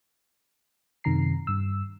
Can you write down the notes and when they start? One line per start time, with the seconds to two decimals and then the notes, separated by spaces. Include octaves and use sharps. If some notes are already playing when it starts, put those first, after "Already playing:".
1.04 F#2 C3 D#3 A#5 C7
1.47 G2 E6